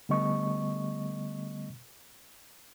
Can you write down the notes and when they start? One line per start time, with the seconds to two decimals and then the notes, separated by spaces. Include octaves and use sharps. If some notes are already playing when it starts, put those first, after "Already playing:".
0.09 D3 G3 A3 B3 D#5 C#6